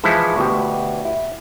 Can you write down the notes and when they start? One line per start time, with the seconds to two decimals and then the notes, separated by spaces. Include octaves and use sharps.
0.04 E3 F3 G#3 E4 A4
0.36 D2 B2 G4
1.05 E4